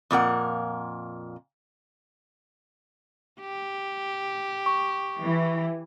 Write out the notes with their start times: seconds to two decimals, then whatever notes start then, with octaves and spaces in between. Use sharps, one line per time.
0.11 F2 A#2 A#4 F#5
3.40 G4
4.66 C#6
5.22 E3